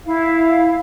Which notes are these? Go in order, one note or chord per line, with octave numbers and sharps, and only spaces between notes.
E4 F5